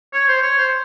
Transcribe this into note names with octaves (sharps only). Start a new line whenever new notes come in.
C#5
C5
C#5
C5